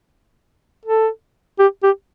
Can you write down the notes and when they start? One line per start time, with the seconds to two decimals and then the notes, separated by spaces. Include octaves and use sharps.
0.86 A4
1.59 G4
1.83 G4